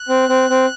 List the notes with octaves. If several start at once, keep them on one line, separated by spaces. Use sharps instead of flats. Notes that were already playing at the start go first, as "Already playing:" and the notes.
Already playing: F#6
C4
C4
C4